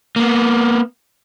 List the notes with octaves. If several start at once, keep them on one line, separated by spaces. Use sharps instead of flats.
A#3 B3